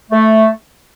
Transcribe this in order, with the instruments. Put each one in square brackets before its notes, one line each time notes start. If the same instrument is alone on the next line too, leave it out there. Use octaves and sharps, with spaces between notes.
[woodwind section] A3